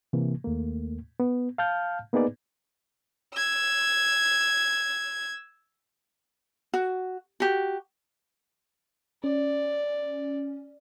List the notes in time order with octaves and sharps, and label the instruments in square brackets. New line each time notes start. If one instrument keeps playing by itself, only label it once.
[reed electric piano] C3 E3 A#3
D#2 A3 A#3
B3
F5 A5 F6 G6
A#3 B3 D#4 G#4 B4 D5
[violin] E6 G#6
[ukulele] F#4
F#4 G4
[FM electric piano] C#4 [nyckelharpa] D5